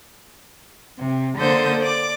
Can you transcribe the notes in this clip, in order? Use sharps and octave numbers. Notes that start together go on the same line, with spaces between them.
C3
D3 A#3 A4 C5 D#6 G6
D5 D6